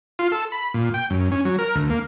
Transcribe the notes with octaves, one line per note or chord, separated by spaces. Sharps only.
F4
A4
B5
A#2
G5
F#2
C#4
F#3
A#4
D2
A#3